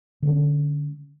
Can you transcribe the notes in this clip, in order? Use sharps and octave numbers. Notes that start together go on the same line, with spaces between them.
D3 G#3 C#4